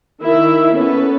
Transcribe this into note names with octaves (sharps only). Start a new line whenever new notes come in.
D#3 E4 A#4 E5
B3 C#4 A4 B4